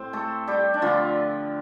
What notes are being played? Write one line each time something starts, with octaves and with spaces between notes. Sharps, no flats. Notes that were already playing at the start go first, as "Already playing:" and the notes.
Already playing: A2 C4 C5
A3 A4
G3 G4
D4
D3 F3 A3 F4